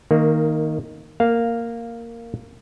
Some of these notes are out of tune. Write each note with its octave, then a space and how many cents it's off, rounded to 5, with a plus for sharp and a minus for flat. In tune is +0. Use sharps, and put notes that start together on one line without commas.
D#3 +5 A#3 -15
A#3 -10 F5 +0